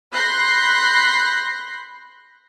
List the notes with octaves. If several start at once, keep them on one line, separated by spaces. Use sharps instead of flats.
B5 C6 F#6 G6 A#6 C7